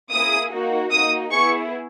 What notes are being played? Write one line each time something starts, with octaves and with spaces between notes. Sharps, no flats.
A#3 E4 G#4 D#6
A#3 D#4 F#4
A#3 D#4 F#4 D#6
B3 E4 G#4 C#6